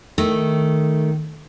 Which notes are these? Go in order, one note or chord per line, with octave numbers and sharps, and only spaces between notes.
D#3 A3